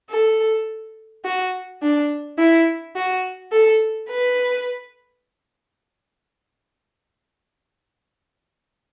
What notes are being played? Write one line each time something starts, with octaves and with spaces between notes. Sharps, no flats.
A4
F#4
D4
E4
F#4
A4
B4